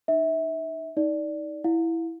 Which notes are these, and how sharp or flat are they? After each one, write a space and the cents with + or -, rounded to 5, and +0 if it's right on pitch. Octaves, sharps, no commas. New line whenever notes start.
D#4 -35 E5 -25
D#4 +20 D5 +0
E4 +0 F5 +40